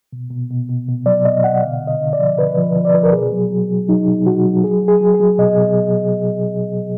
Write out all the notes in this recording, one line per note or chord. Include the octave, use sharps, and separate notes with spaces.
B2
B2
B2
B2
B2
F#3 D5
B2 D#5
B2 F#5
D3 F5
D3
D#5
D3
D5
F3
D3 B4
F3
F3
D5
F3 B4
A#4
B2 G#4
F#3
F#3
F#3
F#3 D#4
B2
B2 F#4
F#3
F#3 G#4
F#3
G#4
F#3
G#4
F#3
B2 D#5
B2